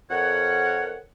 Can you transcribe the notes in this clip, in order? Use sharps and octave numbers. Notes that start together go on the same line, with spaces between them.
F2 A#4 C#5 F#5